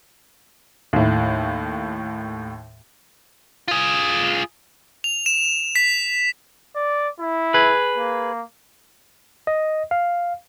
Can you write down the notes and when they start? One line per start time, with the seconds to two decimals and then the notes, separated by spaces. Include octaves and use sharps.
0.93 D#2 A2
3.68 F4 G#4
5.04 F7
5.26 E7
5.76 B6
6.75 D5
7.20 E4
7.54 G#4 B4
7.98 A#3
9.47 D#5
9.91 F5